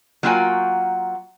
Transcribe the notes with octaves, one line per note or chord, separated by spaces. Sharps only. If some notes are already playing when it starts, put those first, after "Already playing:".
F#3 A#3 F4 F#4 G5 G#5